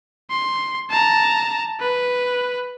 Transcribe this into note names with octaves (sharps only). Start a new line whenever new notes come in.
C6
A5 A#5
B4